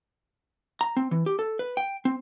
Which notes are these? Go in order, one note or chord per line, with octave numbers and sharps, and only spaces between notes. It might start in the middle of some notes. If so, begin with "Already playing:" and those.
A#5
C4
E3
G4
A4
B4
G5
C4